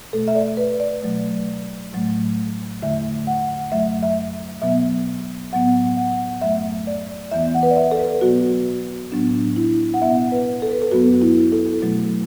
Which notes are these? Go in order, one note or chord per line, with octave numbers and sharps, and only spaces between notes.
B2 A3 A4
E5
D5
B4
D5
B2 F#3 A3
A2 F#3 A3
E2 D3 A3 E5
F#5
F#2 F#3 A3 E5
E5
B2 F#3 B3 E5
A2 F#3 B3 F#5
F#5
F#2 F#3 A3 E5
D5
E2 E3 B3 E5
F#5
B4
D5
E5
A4
B4
B2 F#3 B3 F#4
A2 F#3 B3 D4
E4
F#5
B2 B3 E5
B4
A4
B4
A4
F#2 F#3 B3 F#4
E4
A4
B2 F#3 A3